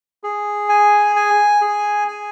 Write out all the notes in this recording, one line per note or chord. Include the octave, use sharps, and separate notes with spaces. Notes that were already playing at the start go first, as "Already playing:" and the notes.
G#4
G#5
G#5
G#4
G#5